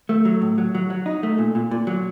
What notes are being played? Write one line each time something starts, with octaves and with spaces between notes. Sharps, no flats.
A3
F#3
A2
F#3
F#3
F#3
D#4
A3
A#2
A#2
A#2
F#3